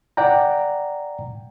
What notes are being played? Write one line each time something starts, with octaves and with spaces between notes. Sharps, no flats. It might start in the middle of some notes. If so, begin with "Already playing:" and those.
D5 F#5 G5 A#5